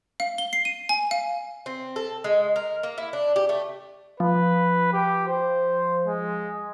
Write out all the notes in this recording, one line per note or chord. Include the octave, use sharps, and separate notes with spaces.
F5
G7
C7
D#7
G#5
F5
C4
A4
G#3
A#4
A#3
E4
D4
G4
A3
F3 B4
G4
C5
G#3